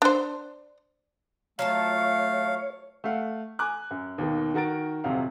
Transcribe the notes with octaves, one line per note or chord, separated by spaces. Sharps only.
D4 C5
F#3 A3 F4 C#5 F5 A5
A3 F5 F#5
G#5 A#5 D6 F#6
F#2
D#2 B2 D#3 A#3
D#3 F#4 A#4 A6 D7
D#1 F2 C3 F#3 F5 F#5